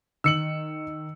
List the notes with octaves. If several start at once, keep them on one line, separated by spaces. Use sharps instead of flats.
D#3 E6 C#7 F#7